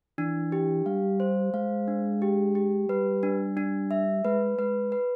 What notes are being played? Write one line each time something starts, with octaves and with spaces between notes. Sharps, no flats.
E3 D4
G4
G3 F5
C5
G#3 F5
D4
G4
G4
G3 B4
D4
D4
E5
G#3 B4
G#3 B4
B4